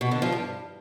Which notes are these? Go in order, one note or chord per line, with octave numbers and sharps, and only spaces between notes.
B2
D3
F3
G2